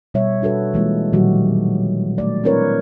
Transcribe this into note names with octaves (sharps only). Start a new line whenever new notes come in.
B2 G3 C#5 E5
D4 F#4 A4 B4
E3 G#3 A#3 F4
A#2 D#3 F#3 G3 F#4 G4
A3 D5
C4 D4 E4 A#4 B4 C#5